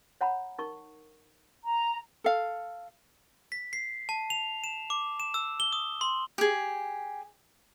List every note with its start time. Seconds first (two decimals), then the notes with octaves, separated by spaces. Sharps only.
0.21 C#5 F#5 A#5 B5
0.58 D#4 A#4 C#6
1.65 A#5
2.24 A4 F5
3.52 B6
3.73 C7
4.09 A5
4.30 F7
4.64 E7
4.90 D6
5.20 E7
5.34 E6
5.60 G7
5.73 D#6
6.01 C6
6.38 G4 G#4